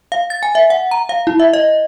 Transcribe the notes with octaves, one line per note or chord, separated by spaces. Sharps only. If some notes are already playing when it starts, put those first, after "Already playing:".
F5
A6
G#5
E5
F#5
A#5
F5
E4
E5
D#5